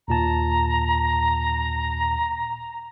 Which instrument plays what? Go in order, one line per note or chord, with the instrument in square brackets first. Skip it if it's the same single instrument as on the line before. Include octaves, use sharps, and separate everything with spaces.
[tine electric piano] D#2 A#2 A5 [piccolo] A#5